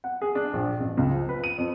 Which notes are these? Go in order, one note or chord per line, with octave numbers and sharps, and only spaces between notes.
F#5
G#4
D4
A#1
A1
C#2
F3
B4
D#7
F2